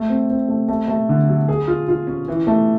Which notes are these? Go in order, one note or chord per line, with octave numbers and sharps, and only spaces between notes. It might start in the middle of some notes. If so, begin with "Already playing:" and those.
Already playing: A3
C4
C4
A3
A3
A3
D3
F#3
G#4
F4
F4
C#4
E3
A3